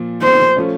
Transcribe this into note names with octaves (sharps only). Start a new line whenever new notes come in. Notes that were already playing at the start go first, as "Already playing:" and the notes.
Already playing: A#2 F3
C5
F3 A3 C#4